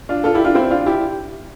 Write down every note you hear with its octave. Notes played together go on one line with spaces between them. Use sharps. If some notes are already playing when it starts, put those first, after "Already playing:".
D4 F4
F4 A4
E4 G4
D4 F4
C4 E4
D4 F4
E4 G4